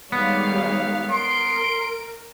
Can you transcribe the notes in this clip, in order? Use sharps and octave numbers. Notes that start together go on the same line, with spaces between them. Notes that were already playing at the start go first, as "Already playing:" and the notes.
D#3 G3 G#3 B3 C#5 F5
A#4 C6 D7